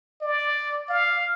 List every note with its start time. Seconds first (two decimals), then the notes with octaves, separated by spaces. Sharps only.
0.22 D5
0.90 F5